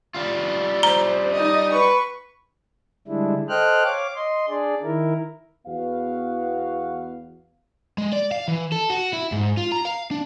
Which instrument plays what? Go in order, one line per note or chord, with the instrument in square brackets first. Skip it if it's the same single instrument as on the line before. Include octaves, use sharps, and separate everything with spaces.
[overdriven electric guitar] G3 F4
[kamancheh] C5 [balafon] A#5
[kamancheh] D#4 D#5
[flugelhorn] B4 [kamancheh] C#6
[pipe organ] D3 G3 G#3 D4 E4
A4 C5 D#5 G5 F6 F#6
C#5 F5 D6
D#5 C6
D4 G#4 D5
D#3 E4 A#4
[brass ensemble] E2 B3 F#4 F5
[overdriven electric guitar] G#3
D5
F5
E3
A4
F#4
E4
G#2
F4
A#5
F5
D4